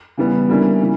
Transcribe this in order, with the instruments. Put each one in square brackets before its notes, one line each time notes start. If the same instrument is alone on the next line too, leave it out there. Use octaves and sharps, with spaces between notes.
[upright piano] C#3 E3 G3 B3
D3 G3 A#3 C#4 E4
C#3 E3